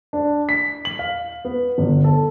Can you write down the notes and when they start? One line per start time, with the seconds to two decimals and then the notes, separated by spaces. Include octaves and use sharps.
0.13 D4
0.49 B6
0.85 F#7
0.99 F5
1.45 B3
1.78 G1
2.04 A4